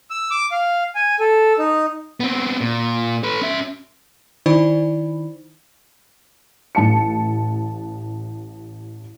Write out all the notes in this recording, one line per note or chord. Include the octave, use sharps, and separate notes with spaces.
E6
D6
F5
G#5
A4
D#4
B3 C4
A#2
A4 B4
C#4 E5
D#3 D#4 E4 C5 D5 B5
A1 A5 C#7